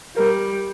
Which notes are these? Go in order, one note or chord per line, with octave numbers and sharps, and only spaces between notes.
G3 A#4